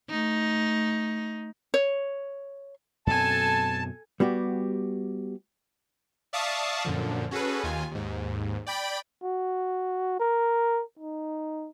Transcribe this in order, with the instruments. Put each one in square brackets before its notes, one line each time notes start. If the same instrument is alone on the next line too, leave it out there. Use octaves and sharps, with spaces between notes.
[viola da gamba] A3 D#4
[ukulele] C#5
[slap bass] F#2 B2 C4 [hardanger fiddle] A4 G#5 [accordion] A5
[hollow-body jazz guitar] G3 B3 F#4 G4
[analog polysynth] D5 E5 F5 A5 C#6 D#6
F#2 A#2 D3 F3
C#4 F#4 G#4 A4 B4
D#2 D#3 F4 G#5
D#2 G#2
D5 G5 B5 D7
[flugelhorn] F#4
A#4
D#4